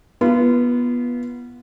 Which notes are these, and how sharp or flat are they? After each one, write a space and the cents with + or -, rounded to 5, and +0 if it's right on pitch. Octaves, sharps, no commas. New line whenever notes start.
B3 -20 F4 -30